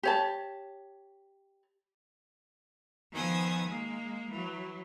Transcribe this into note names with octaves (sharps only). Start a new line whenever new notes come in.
G4 C#5 A5
D#3 F3 B3 G#5 D#6 E6
G#3 A#3
E3 F#3